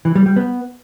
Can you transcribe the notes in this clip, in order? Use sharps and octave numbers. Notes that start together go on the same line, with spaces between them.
E3
G3
G3
B3